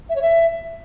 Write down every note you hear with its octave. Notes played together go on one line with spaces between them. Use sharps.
E5
C#5
E5